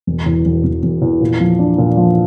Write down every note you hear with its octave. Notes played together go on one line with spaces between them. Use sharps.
E1
E2
E1
E1
E1
E2
A#2
F3
D4
A#2
F3